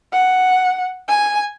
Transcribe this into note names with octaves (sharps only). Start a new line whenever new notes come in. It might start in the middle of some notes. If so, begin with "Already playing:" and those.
F#5
G#5